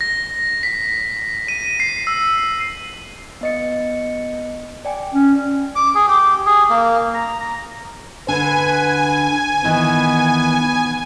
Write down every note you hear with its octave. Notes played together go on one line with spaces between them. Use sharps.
A#6
B6
D#7
C7
E6
B3 D#5 C#7
D5 G5 G#5
C#4
D6
G#4
G4
G#4
A#3
A#5
A#5
D3 B4 G#5
D#3 E3 B3